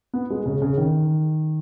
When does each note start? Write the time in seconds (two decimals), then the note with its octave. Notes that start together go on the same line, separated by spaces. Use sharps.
0.13 B3
0.30 G#3
0.46 C#3
0.62 C#3
0.77 D#3